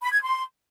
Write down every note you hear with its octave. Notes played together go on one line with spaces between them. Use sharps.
B5
G#6
C6